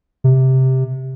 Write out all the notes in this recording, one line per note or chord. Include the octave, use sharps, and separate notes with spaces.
C3